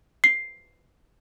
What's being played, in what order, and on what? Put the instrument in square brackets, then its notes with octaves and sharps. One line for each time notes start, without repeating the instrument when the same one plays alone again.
[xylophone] C7